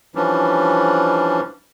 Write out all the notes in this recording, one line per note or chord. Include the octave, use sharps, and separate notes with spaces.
E3 F3 G3 C#4 D4